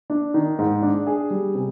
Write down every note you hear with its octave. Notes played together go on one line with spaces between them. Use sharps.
D4
D#3
G#2
D4
G#4
G3
C3